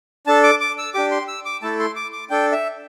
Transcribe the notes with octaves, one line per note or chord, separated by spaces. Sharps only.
D4 A4 A5
D6
D6
E6
D4 G4 D6
C6
E6
D6
A3 E4 A4 A5
C6
D6
D6
D4 A4 G5
E5